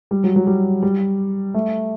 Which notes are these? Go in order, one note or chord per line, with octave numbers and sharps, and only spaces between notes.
G3
F#3
F#3
G3
G3
A3